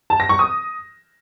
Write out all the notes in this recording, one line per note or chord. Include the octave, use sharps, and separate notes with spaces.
A5
A#6
C#6
D#6